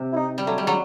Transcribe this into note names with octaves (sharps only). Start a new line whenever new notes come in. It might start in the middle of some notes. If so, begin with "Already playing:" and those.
Already playing: C3
E4
D#4
G3
F#3 A3
G3
F#3 G#3